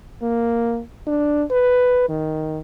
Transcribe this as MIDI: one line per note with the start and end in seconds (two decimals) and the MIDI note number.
0.22 0.81 58
1.07 1.43 62
1.51 2.07 71
2.09 2.58 51